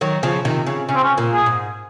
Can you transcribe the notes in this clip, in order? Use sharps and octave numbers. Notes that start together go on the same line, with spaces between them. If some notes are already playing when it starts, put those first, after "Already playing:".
D#3 F#3
C#3 F3
C3 D#3
C#3
C#3 C#4
C4
C#4
A#2
G#4
G#2